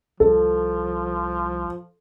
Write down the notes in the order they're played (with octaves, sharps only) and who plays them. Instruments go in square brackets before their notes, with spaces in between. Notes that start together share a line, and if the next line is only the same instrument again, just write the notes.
[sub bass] C2 [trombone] F3 [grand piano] A4